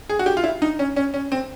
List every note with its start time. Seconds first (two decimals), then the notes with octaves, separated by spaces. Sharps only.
0.09 G#4
0.19 F#4
0.26 G4
0.37 F4
0.44 E4
0.62 D#4
0.79 C#4
0.96 C#4
1.14 C#4
1.32 C4